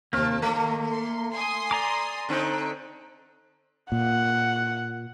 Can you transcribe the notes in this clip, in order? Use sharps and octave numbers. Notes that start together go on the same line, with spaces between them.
D#2 C3 A#3 C4 A5 F6
D#3 A3 A#3
C6
G#5 C6 D#6
D5 A#5 D6
D3 C4 D#4
A#2 F#5